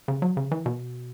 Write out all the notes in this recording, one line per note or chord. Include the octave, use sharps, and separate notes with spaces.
C#3
F#3
C#3
E3
B2